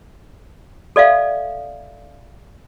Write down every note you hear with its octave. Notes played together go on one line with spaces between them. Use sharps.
A4 D5 E5 F5